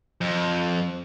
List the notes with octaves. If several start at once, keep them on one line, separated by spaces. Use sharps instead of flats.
F2